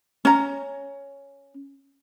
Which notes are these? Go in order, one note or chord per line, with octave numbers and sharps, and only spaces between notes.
C#4 A#5